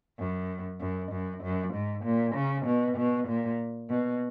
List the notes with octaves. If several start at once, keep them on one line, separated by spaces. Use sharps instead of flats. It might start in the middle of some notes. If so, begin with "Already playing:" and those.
F#2
F#2
F#2
F#2
G#2
A#2
C#3
B2
B2
A#2
B2